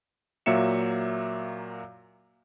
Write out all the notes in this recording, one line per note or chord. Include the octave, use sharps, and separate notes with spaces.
A#2 F#3 A#3 E5 C#7 E7